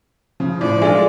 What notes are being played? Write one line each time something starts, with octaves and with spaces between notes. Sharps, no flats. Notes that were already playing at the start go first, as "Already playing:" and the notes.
C#3 F3
A2 D5
G#3 F4 A4 E5